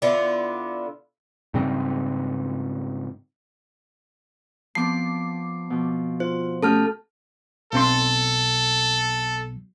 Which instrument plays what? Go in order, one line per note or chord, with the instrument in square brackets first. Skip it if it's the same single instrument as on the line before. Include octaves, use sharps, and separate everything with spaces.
[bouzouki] D3 B3 E4 F4
[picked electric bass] G#2 C#3 G3 C4
[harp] F3 B3 C4 [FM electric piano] A5 D6 [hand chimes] C7
[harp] B2 F3
[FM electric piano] F4 [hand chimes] C5
[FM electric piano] A3 C#4 [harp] G4 F#5 G6 [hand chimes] A4 A5 F6
[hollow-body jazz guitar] B1 C4 C6 [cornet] A4